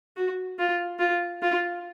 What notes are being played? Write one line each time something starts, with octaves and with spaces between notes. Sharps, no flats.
F#4
F4
F4
F4